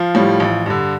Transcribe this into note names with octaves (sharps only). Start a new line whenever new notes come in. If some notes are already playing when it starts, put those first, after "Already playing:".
Already playing: F3 F4
A2 G3
A1
G2 D3